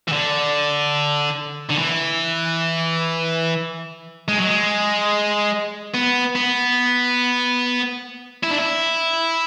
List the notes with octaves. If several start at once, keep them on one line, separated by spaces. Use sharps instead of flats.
E3
D3
D3
E3
G#3
F#3
G#3
B3
B3
E4
D4
E4